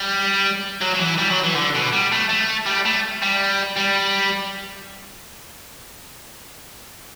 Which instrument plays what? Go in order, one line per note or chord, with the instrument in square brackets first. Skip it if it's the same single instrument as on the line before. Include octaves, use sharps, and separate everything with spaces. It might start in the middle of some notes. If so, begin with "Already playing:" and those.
Already playing: [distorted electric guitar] G3
F#3
F#3
E3
G3
F#3
E3
D3
B2
G3
A3
A3
G3
A3
G3
G3